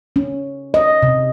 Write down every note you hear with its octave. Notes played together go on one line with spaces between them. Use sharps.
C#4
D#5
C3